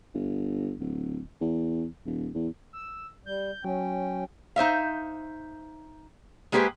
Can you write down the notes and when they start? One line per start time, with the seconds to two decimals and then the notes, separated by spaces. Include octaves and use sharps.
0.14 G1
0.80 D1
1.41 E2
2.06 D#1
2.34 E2
2.73 E6
3.26 G3 G6
3.64 F#3 C#4 G5
4.56 D#4 C5 E5 F5
6.52 G#3 A#3 G4 G#4 B4 C5